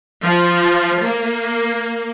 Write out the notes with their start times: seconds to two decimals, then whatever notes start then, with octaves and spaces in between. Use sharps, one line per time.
0.24 F3
1.03 A#3